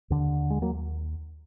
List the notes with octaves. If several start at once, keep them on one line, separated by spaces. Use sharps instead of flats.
D#2 D3
G#3
F#3 A#3